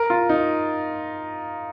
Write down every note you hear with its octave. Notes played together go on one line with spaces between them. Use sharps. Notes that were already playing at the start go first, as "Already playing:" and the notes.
Already playing: A#4
F4
D#4